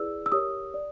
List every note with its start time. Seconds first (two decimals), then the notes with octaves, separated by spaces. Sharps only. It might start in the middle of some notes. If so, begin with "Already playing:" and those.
Already playing: E4 G#4 B4 D5 E6
0.26 E6
0.32 G4 A#4 C#5 D#6
0.74 D5